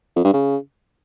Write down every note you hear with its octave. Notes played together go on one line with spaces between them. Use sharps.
F2
G2
C#3